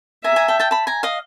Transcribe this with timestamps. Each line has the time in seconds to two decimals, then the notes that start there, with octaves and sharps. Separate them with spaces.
0.24 E5 G#5 A#5
0.36 G#5 A#5
0.48 G5 A5
0.60 G5 A5
0.71 A5 B5
0.87 G#5 A#5
1.03 D#5 F5